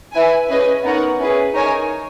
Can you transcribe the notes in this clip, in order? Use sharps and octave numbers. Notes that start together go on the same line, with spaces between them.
E4 B4 E5 G#5
C#4 G#4 B4 D#5 G#5
B3 D#4 A#4 C#5 F#5
C#4 E4 G#4 B4
D#4 A#4 C#5 G#5